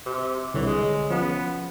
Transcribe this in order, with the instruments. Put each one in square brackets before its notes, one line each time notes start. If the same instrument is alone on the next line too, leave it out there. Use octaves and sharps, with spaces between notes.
[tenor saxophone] C3
[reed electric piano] C2 D3 C#5 [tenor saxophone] E3
[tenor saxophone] G#3
[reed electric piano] F3 C#4 [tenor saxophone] B3